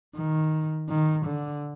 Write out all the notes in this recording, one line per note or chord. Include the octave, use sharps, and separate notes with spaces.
D#3
D#3
D3